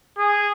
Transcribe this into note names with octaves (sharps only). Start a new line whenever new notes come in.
G#4